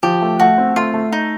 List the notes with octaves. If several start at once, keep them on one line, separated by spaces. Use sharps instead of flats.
F3 G4
A3
A3 F#4
C4
A3 F4
A3
D#4